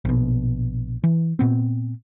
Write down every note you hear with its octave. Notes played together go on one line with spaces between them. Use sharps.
A#1 B2
E3
A#2 B3 C4